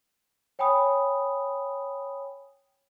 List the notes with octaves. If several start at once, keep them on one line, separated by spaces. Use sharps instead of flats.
C#5 G5 G#5 B5 D#6